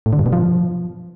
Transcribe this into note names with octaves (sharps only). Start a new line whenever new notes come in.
A2
D3
G2
B2
F3